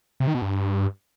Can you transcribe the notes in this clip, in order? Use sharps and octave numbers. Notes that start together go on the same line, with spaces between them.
C3
D#3
B2
G2